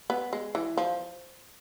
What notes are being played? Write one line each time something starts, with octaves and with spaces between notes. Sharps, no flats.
B3
G#3
E3
F3